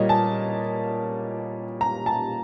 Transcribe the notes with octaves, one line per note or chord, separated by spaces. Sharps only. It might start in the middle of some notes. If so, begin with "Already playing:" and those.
Already playing: A#2 G3 A#3 C#5 D#5
A5
A#5
A5